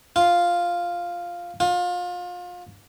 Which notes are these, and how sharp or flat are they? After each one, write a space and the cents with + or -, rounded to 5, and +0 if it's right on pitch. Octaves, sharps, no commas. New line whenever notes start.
F4 +0
F4 +30